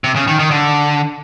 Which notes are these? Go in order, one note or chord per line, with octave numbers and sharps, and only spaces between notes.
C3
C#3
D#3
D#3
D3